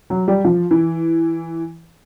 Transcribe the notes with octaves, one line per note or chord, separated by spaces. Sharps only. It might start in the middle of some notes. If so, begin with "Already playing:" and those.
F#3
G3
F3
E3